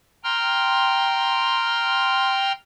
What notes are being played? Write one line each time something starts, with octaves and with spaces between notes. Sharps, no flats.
G5 A#5 C6 F6